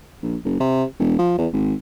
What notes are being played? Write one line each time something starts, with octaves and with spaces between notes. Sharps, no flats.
A#1
F#1
C3
E1
F3
E2
G#1